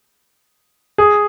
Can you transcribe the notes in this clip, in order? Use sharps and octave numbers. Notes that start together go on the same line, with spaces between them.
G#4